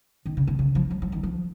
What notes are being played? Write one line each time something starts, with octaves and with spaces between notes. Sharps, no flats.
D#3
C#3
C3
C#3
F3
F#3
F3
D#3
F3